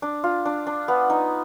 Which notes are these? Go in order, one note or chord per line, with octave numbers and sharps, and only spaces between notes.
D4
F4
D4
D4
B3
D#4